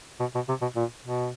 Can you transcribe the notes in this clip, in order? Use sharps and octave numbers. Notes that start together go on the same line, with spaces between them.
B2
B2
C3
B2
A#2
B2